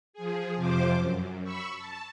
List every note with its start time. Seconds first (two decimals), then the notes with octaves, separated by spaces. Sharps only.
0.13 F3 G#4
0.55 F2 C3 F3 C5 D6
0.98 F#2
1.44 B5 C#6 E6
1.76 A5